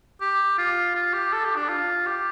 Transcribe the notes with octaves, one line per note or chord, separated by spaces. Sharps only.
G4
F4
F4
G4
A4
G4
D4
F4
G4